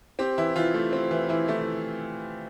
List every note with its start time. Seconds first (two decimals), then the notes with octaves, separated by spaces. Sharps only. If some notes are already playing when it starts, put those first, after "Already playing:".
0.19 C4 G4
0.38 E3 E4
0.56 E3 F4
0.74 A3
0.93 C4
1.11 E3
1.29 E3 E4
1.48 A3 E4